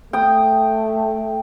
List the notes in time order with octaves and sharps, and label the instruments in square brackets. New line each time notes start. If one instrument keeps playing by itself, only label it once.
[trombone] A3 [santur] G5 D#6